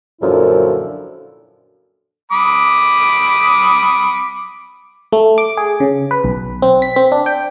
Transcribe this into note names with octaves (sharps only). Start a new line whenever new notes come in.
F#2 A#2 D3 F3 E4
B5 D6 D#6
A3
D6
G#4
C#3
B4
B1
C4
B6
C4
D4
G5